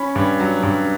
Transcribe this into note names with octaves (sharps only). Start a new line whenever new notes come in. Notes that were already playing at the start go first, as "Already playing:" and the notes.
Already playing: C#4 B5
G2
F#3
G2